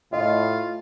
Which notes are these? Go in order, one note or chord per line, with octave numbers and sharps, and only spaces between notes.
A2 F4 D#5